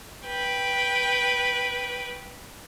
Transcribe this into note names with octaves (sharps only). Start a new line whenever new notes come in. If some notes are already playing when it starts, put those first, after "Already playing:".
B4 G5